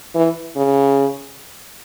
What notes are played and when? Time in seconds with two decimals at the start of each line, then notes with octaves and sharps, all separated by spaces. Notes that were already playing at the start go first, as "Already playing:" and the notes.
0.16 E3
0.57 C#3